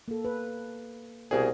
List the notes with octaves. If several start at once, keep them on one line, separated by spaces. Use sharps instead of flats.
A#3 A4
B4
C2 B2 G#4